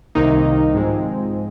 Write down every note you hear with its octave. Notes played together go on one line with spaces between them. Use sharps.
C2 C3 D#3 A#3 D#4
G#2 F3 G#3 C4